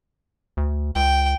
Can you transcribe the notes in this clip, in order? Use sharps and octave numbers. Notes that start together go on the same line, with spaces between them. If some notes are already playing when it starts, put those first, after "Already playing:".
D2
C#2 G5